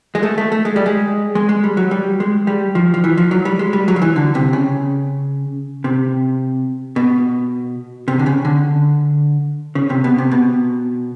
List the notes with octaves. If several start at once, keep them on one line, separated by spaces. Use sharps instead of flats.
G#3
A3
A3
A3
G#3
G3
G#3
G#3
G#3
G3
F#3
G3
G#3
G3
F3
F3
E3
F3
F#3
G3
G#3
G3
F#3
F3
E3
D3
C3
C#3
C3
B2
C3
D3
C#3
D3
C#3
C3
B2
C3
B2